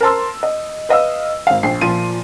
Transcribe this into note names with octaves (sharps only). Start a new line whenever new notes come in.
A#4 C5 A5 C6 E6
D#5
B4 D#5 F5 E6
G#1 F5
A#1 G5 C7
A#2 F3 F4 D#7